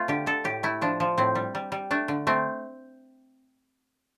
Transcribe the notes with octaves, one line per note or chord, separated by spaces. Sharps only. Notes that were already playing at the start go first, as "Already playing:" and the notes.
Already playing: A3 C4 F4
D3 G4
D3 A4
A2 G4
A3 E4
F3 D4
F3
A2 C4
G3
G3
G3
A3 D4
D3
A3 C4